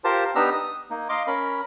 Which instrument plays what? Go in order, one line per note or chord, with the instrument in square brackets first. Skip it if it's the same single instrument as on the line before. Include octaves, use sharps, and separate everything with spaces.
[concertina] F4 G4 A#4 C5 A5
B3 D4 D#4 G4 A#5 E6
D#6
A#3 D#4
D#5 F5 C6 D6
C#4 A#4 B5